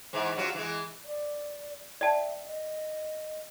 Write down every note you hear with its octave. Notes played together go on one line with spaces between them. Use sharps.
G#2 E3
F#3 G3 F4
E3 G#3
D5
D5 E5 G5 A5
D#5